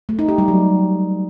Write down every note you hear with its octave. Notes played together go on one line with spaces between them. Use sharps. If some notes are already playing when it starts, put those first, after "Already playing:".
A3
D#4
G4
G3
F#3